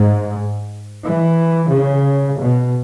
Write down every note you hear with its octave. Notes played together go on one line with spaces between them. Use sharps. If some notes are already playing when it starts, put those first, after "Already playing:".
Already playing: G#2
E3
C#3
B2